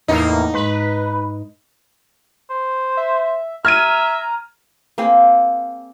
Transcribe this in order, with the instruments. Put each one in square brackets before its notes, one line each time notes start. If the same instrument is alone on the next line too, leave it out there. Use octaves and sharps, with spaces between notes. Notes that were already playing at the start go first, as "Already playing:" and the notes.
[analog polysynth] E2 A2 A#3 [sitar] D#4
[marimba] G#2 G#3 [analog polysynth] B4
[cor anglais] C5
[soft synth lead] E5
[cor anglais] E5 [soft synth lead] A#5 [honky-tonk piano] F6 G#6 D#7
[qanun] A#3 C4 G#4